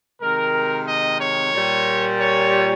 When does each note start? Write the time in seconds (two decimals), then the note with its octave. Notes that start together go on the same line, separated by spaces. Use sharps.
0.21 C3 D#3 G#3 A#4
0.87 D#5
1.20 C#5
1.53 A#2 G3
2.20 C#5